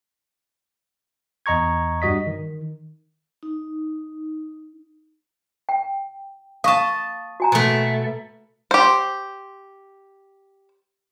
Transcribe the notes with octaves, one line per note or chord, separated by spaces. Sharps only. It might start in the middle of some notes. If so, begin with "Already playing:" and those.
E2 D#5 A#5 C#6 G#6
G2 G3 F#4 D#5 B6
D#3
D#4
G5
D#5 F5 A5 C#6
F#4 G#5 A#5
B2 A3
G4 C5